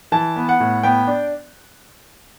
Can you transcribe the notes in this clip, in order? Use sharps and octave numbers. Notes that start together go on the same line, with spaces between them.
E3 A5
B3
F#5
A2
B3 G5
D4